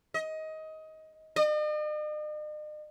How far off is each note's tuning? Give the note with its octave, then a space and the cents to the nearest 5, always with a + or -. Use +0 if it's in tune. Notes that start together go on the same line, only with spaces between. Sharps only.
D#5 +20
D#5 -45